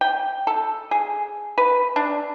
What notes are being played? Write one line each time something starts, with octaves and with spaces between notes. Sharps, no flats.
G5
A4
G#4
B4
D4